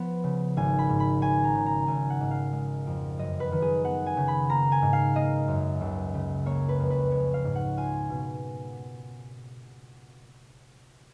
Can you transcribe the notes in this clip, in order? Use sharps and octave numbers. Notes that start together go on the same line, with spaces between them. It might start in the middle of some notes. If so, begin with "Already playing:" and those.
Already playing: F3 B3 F4
C#3
G#1 G#5
B5
G#2
B5
C#4 G#5
A#5
C#3
A#5
G#1 G#5
F#5
G#2
F5
G#3
F2
F#2 D#5
B4
D#3
G#4
B3 F#5
G#5
C#3
B5
A#3 A#5
G#5
G#2
F5
A#3 D#5
F#2
C#2
C#3
A#3 C#5
B4
F2
B4
G#3 C#5
F5
G#2
F#5
F4 G#5
B2